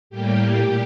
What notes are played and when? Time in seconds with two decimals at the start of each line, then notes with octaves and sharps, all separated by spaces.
0.10 A2 G3 A#3 G4
0.54 A#2